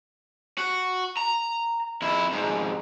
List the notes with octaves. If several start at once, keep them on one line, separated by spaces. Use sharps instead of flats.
F#4
A#5
F2 E4
F2 G#2